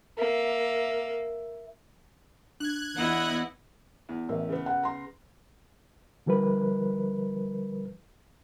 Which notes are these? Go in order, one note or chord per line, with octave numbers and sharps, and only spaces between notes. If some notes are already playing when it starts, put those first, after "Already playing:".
A#3 E5
D4 F#6 G#6
E2 B3 E4 D#5 F#5
E2
A1 A#4 E5
C#3 B3
F#5
A#5 C6
D3 F3 G3 A#4 B4